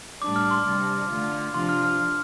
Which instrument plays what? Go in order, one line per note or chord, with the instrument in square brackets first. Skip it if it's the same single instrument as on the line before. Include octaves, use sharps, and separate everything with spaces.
[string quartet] A2 G3 D4 [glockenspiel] D6
[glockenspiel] F6
C6
[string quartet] C3 G3 D4
D3 A3 F4
[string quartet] C3 F3 D4 F4 [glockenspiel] C6
[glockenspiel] F6
F6